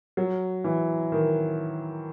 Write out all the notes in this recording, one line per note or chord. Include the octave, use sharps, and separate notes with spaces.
F#3
E3
D#3